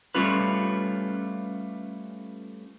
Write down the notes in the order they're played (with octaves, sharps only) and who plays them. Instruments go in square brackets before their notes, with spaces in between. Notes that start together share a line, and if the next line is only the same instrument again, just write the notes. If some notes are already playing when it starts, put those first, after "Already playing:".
[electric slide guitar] G3 A3 C#4 F4 B4